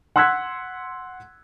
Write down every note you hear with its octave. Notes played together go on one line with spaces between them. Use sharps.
F#5 C6 E6 F#6 G#6 B6